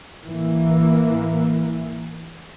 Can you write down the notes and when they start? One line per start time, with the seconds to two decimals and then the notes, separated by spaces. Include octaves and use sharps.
0.25 A1 E3 A#3